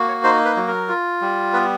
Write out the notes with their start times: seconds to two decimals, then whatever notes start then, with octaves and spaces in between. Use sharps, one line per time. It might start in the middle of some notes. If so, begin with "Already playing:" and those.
Already playing: A#3 F#4
0.08 C#5
0.24 D#4 C5
0.45 B4
0.56 F#3
0.68 A#4
0.88 F4
1.21 G3
1.53 B3 B4